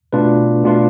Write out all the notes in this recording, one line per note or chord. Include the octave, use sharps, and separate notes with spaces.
B2 A3 D4 F4 B4
B2 A3 D4 F4 B4